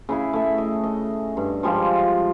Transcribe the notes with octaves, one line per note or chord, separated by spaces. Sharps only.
C#3 E4 G#4
A3 E5
D#5
D#5
G2
F3 G3 G#3 F4